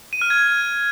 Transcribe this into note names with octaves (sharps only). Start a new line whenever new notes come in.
D#7
F6
G#6